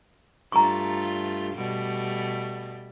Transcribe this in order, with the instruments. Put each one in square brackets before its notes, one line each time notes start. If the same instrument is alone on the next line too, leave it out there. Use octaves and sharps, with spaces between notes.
[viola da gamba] G2 A3 F4 [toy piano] A#5 C#6
[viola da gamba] B2 G3 A3